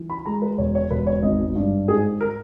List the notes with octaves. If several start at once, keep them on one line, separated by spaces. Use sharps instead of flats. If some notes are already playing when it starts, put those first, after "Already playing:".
Already playing: E3
B5
G#3 A#5
B4
E1 C#5
C#5
E1 B4
C#5
G#1 D#5
G2
G#2 G#4
A#4